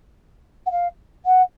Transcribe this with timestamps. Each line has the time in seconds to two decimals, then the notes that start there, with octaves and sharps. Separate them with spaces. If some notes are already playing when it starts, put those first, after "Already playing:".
0.66 F#5
0.71 F5
1.26 F#5